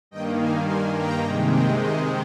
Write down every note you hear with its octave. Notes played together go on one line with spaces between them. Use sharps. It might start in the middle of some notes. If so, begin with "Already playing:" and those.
G2 D#3 A#3 D#5 G5
F5 G#5
G#5 C6
G5 A#5
C3 D#3 G#3
D#5 G5
C5 D#5